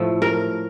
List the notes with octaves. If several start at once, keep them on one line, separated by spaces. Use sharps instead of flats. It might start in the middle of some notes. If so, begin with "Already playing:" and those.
Already playing: A2 F3 A3
A#4